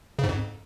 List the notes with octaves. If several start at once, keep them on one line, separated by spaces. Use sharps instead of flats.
F2 G#2 C#3